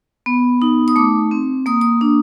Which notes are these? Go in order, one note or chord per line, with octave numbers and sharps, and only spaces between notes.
B3
D#4
D#6
A3 D6
C4
A#3 D#6
D#6
D4